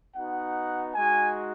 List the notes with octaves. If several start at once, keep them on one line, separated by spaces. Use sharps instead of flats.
B3 D#4 F#4 F#5
G#3 D#4 F#4 G#5